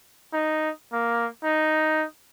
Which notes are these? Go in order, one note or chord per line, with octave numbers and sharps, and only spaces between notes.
D#4
A#3
D#4